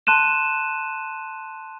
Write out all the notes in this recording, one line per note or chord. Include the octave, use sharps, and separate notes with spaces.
A5 C6 F#6 D#7 E7